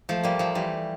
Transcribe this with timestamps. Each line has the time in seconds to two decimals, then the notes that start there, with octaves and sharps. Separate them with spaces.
0.09 F3 A3
0.24 G3 A#3
0.39 F3 A3
0.55 E3 G3